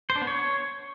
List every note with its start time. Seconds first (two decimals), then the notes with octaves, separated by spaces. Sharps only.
0.10 C5
0.16 D4
0.21 B3
0.27 C#5